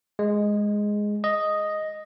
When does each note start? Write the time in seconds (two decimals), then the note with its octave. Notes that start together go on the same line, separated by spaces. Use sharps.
0.19 G#3
1.24 D#5